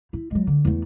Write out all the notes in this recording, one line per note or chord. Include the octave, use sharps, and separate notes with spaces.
E4
F#3 G#3
D3
E2 A3